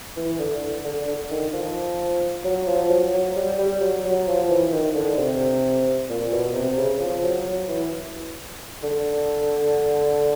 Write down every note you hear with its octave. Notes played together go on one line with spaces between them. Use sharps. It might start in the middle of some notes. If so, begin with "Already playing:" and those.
E3
D3
D3
D3
D#3
F3
F#3
F3
F#3
F#3
G3
G3
F#3
F#3
F3
E3
D#3
D3
C3
A#2
B2
C3
C#3
F3
F#3
F#3
E3
D3